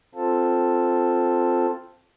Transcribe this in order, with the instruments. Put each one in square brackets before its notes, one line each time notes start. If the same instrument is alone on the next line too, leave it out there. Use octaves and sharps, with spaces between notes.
[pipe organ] C4 F4 A4